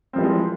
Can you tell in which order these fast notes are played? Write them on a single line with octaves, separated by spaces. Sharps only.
C4 F3 G3 E3 G#3